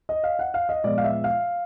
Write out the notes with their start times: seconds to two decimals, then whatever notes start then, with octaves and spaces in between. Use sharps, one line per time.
0.09 D#5
0.24 F5
0.39 F#5
0.54 F5
0.69 D#5
0.84 A#2 F3 G#3 B3 D5
0.98 F5
1.04 E5
1.24 F5